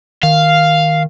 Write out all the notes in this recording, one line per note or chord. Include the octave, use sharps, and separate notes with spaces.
D#3 F5